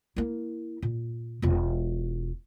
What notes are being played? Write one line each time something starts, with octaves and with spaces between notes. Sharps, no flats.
A#3 E4
A#2
E1 F4